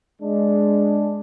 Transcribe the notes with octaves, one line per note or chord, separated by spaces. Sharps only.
G#3 D4